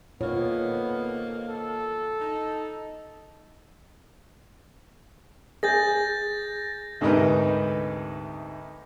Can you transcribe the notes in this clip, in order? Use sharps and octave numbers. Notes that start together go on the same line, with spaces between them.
F2 B2 D#3 A#3 B3 F4 C#5
A4
D#4
G#4 G6 A6 A#6
D2 G#2 C3 D#4 A#4 B4